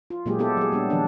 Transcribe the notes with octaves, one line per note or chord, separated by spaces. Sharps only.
F4
A#2 F#3 G#3 A#3 G4 G#4
B3 E4 G4 A4
F#3 G#4
G3 B3 D4
D#3 F3 D4